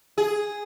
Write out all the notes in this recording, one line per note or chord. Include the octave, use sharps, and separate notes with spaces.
G#4